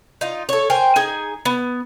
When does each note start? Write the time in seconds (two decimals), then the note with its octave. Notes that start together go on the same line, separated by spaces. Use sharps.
0.21 D#4 F4
0.49 A4 C#5
0.70 A#4 C5 G5 G#5
0.96 D#4 G#4 G#5
1.45 B3